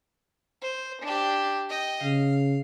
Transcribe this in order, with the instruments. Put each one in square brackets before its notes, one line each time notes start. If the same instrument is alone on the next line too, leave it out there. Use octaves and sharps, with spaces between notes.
[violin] C5
D4 G4
D#5 G5
[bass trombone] C#3 [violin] F5